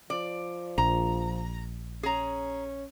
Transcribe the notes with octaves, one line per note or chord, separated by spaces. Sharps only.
F3 D5
A#1 A#5
C#4 G#4 A#5